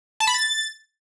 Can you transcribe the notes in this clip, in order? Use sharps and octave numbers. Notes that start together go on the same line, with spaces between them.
A5
B5
A6